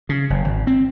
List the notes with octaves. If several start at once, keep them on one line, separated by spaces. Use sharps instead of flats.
C#3
F#1
G#1
C4